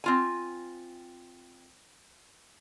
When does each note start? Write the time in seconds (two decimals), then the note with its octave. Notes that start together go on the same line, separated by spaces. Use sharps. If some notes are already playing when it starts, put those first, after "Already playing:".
0.04 C4 F4 G#5